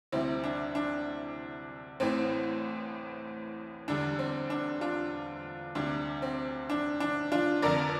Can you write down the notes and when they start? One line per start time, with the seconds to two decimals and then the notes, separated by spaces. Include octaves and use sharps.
0.12 D2 C3 G3 C4 E4
0.44 D4
0.75 D4
2.00 A1 A2 E3 C4
3.88 E2 D3 G3 D4
4.19 C4
4.50 D4
4.81 D4 F4
5.75 D2 C3 G3 D4
6.22 C4
6.70 D4
7.00 D4
7.32 D4 F4
7.62 F1 F2 D3 A#4 D5